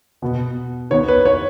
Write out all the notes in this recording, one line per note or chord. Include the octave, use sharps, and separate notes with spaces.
B2 B3
D#3 B3 C#5
B4
C#5